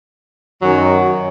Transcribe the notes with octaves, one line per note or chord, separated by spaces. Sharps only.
F#2 D#3 F#3